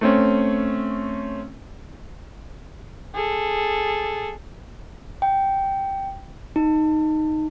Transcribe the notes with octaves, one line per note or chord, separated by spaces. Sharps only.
A3 C4 C#4
G#4 A4
G5
D#4